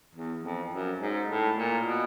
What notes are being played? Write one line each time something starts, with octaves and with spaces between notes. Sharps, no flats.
E2
F2
F#2
G#2
A2
A#2
B2